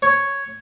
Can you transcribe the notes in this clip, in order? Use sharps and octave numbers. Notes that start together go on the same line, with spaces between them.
C#5